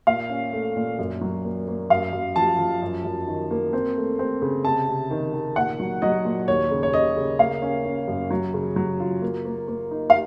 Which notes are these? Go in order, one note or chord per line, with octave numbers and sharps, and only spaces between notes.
A#2 F5
C#4
A3
A#2
F#2
F#3
A#3
A#3
F#2 F5
F#2
F3 A5
F3
F#2
F#2
D#3
A#3
C4
A3
C4
C#3
C3 A5
C3
D#3
D#3
A#2 F#5
F#3
F#3 D#5
A#2
D#2 C#5
C#3
C#5
C#3 D#5
C#3
A#3 F5
C#4
C#4
F#2
F#3
C#3
F#3
F4
A#3
A#3
A#3
D#4
F5